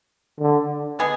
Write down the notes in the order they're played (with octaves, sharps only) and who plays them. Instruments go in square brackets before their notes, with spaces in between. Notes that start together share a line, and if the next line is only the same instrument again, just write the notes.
[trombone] D3
[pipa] G#3 B3 D4 G#4